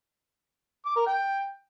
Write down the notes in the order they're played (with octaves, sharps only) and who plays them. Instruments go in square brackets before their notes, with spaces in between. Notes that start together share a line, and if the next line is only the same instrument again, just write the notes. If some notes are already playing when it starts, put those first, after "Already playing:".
[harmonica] D6
A#4
G5